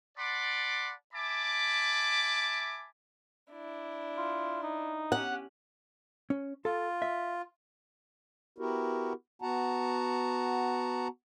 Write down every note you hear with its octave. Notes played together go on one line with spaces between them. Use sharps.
D5 F#5 A5 B5 C6 D6
E5 G#5 A5 B5 D6
D4 E4
F4
D#4
C#4 G4 F#5
C#4
F4 A4
E5
B3 E4 F#4 G4 A#4
B3 F#4 F#5 A5 A#5